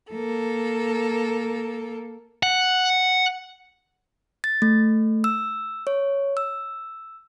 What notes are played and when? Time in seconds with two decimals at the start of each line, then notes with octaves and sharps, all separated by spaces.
0.11 A#3 A4
2.43 F#5
4.44 A6
4.62 A3
5.24 E6
5.87 C#5
6.37 E6